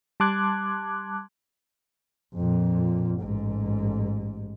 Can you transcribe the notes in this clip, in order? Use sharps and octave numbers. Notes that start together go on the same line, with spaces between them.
G3 A5 C6 D6 F#6 G#6
F2 A#2
A1 G#2